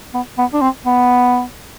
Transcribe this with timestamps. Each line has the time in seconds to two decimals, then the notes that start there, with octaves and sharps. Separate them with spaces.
0.14 B3
0.38 B3
0.54 D4
0.62 C4
0.86 B3